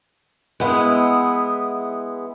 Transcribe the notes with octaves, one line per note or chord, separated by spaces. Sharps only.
G#3 B3 E4